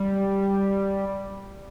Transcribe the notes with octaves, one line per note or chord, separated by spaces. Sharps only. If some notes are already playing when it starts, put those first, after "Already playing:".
Already playing: G3